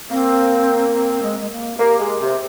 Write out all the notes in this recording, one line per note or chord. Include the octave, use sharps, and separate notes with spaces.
A#3 C4
C4
G#3
G#3
A#3
A#3 G4
G#3
C3